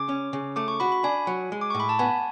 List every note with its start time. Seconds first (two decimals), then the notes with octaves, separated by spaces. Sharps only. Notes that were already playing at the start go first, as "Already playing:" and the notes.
Already playing: C#3 D6
0.09 C#4
0.33 C#3
0.56 A3 D6
0.68 C#6
0.80 F#4 B5
0.92 B5
1.04 D4 G#5
1.27 F#3
1.52 G#3
1.61 D6
1.70 A2 C#6
1.80 B5
1.89 A5
1.99 B3 G#5